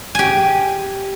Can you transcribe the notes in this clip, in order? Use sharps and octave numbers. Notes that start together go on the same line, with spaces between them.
G4 G#5